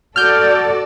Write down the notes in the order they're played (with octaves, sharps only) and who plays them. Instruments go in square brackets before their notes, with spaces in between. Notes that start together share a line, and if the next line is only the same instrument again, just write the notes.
[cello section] F#4 A4 D5 [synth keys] F6 G6